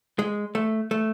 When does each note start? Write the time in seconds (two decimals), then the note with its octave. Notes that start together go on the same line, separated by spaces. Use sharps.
0.19 G#3
0.55 A3
0.91 A3